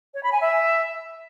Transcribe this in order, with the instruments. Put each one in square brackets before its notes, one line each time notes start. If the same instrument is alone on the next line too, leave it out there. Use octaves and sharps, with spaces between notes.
[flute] C#5
B5
G#5
E5